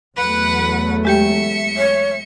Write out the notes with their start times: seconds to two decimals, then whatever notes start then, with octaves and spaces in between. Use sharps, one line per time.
0.17 E2 F#3 A3 B4 F#5
1.05 G#3 G4 E5 G5 C#7
1.77 C#5